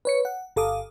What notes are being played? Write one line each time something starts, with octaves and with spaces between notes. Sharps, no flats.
B4 C#5 C#7
F#5
G1 A4 F5 D6 D#6